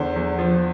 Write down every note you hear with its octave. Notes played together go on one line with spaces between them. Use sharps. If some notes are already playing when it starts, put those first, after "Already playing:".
Already playing: E2 D3 C5
E2
F3